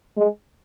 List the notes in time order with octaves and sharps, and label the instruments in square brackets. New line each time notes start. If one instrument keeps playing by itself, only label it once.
[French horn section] G#3